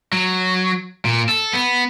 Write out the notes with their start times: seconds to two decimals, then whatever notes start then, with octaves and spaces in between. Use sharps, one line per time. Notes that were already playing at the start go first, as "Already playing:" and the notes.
0.12 F#3
1.05 A#2
1.29 A4
1.53 B3